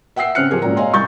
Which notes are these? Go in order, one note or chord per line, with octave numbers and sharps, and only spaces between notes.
E5 F#5 G5 E6 C7
C#3 C4 C#4 F6 F#6 C#7
F3 G4 G#4 A#4
G#1 A#2 C#4 A#5
C#5 D#5 F5 G#5 A#5 C6
C2 C#6 G6 A6